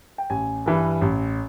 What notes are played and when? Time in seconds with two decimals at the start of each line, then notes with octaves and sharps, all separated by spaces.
0.18 G5
0.30 A1 G#5
0.66 G2 E3
1.01 A1